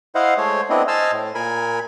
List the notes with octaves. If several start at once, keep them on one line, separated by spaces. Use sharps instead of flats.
E4 C5 D#5 F5 F#5
G#3 A3 C5 C#5
A3 B3 C4 D4 E4 D#5
C5 D#5 G#5 A5 E6 F6
A2
A#2 A#4 G#5 B5